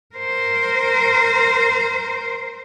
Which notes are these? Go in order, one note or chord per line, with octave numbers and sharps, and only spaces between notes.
A#4 C5